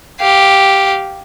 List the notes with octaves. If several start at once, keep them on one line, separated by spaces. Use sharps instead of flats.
G4 F5